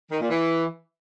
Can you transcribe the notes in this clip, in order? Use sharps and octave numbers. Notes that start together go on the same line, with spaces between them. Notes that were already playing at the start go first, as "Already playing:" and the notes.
D#3
A#2
E3